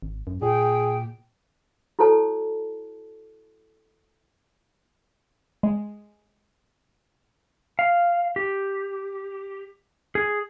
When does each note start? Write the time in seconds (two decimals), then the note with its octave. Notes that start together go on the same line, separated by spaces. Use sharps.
0.02 G#1
0.27 F#2
0.42 A#2 G#4 G5
1.99 E4 F#4 A4 C#5 A5
5.63 G#3
7.79 F5
8.36 G4
10.15 G#4